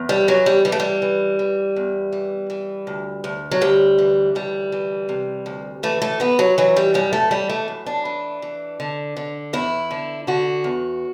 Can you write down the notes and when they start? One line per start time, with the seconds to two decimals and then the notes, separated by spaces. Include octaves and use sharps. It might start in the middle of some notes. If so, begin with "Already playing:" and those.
Already playing: E2
0.09 G3
0.28 E3 F#3
0.46 G3
0.65 E3 G3
0.72 A3
0.80 G3
1.02 E3
1.39 E3
1.76 E2
2.12 E3
2.50 E3
2.87 D2
3.24 D2
3.51 F#3
3.61 D2 G3
3.98 E3
4.35 D2 G3
4.72 E3
5.09 C3
5.46 D2
5.83 E3 A3
6.02 A3
6.20 E3 B3
6.39 F#3
6.58 E3 F#3
6.76 G3
6.94 F#2 G3
7.13 A3
7.31 E3 G3
7.50 A3
7.68 F#2
7.86 D4
8.05 E3
8.42 E3
8.80 D3
9.17 D3
9.53 E2 E4
9.91 D3
10.27 D3 F#4
10.64 E2